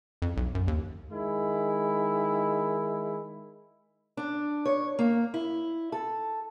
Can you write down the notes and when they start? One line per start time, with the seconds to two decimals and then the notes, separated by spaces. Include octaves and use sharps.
0.22 F2
0.37 B1
0.55 F#2
0.68 D#2
1.11 D#3 G#3 E4
4.17 D4
4.66 C#5
4.99 A#3
5.34 E4
5.92 A4